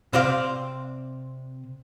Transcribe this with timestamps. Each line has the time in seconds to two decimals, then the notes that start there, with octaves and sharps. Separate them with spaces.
0.13 C3 C4 C5 D5 F5